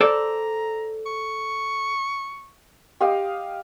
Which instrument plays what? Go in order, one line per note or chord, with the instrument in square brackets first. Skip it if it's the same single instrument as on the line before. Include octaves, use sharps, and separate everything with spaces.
[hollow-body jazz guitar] A4 C5 D5 [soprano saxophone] A#5
[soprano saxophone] C#6
[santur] G4 D#5 F5